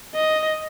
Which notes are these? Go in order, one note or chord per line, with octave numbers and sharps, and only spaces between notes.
D#5